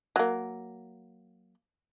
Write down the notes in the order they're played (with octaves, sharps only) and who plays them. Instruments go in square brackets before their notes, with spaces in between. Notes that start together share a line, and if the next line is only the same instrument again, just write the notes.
[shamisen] F#3 A#3